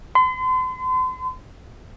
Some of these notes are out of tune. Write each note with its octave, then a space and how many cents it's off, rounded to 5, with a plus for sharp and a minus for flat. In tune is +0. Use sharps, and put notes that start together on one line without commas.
C6 -40